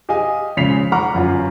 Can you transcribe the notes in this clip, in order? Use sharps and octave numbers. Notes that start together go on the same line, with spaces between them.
G4 G#4 D#5 F5 G5 G#5
A#1 C#3 G#3 B6 C7 F7
F#5 A#5 B5 C#6 D6 F6
G1 F#2 F4